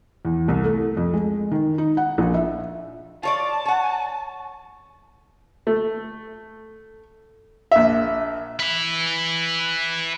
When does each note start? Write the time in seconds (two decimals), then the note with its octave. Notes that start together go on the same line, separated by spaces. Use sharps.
0.25 E2
0.48 C2
0.64 A3
0.97 F2
1.13 G#3
1.52 D#3
1.78 D#4
1.97 F#5
2.18 A#1
2.34 E5
3.23 F4 C#5 D5 A5
3.65 C#5 F#5
5.67 A3
7.71 A#1 E5
8.60 B4 E5